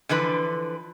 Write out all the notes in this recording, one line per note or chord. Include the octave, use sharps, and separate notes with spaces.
D3 E3 F3 B4